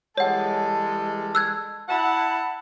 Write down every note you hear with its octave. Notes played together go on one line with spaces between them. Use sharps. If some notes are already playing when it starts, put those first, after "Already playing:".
E3 G3 G#3 A4 C#5 F#5
E6 F#6 G#6
E4 F#5 A5